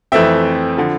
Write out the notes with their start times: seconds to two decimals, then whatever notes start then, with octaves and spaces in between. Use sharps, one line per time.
0.12 F2 E3 A3 C4 E5 G5
0.77 D3 F3